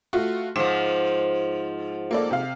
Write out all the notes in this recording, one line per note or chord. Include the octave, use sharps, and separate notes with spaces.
A3 F4 F#4
G#2 F3 E7
A#3 A4 D5
C3 F5